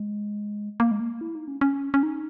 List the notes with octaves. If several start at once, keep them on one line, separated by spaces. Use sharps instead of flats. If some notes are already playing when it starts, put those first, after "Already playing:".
Already playing: G#3
A#3
G#3
A#3
E4
D#4
C#4
C#4
C#4
D#4